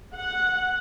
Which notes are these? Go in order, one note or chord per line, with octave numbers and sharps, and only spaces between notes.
F#5